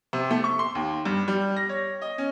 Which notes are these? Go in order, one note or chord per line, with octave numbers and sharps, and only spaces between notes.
C3
A3
C#6
C6
D#2
G2
G3
A#6
C#5
D#5
C#4